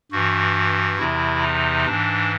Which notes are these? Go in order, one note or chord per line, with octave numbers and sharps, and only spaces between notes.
G2 E3 F#4
E2 C3 E3 E4
D#4
G#2 E3 D4